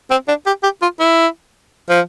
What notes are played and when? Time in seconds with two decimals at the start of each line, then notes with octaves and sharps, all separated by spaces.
0.10 C4
0.28 D4
0.46 G4
0.63 G4
0.82 F4
1.00 E4
1.89 F3